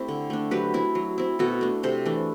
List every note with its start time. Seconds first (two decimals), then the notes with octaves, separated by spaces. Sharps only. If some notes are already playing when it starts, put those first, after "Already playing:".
Already playing: A3 C4 E4 G4
0.08 D3
0.30 A3 D4
0.51 F#3 G4 B4
0.74 C4 E4
0.95 F#3
1.18 C4 E4
1.39 B2 F#4 A4
1.61 A3 D4
1.83 C3 A4 C5
2.05 E3 A3 D4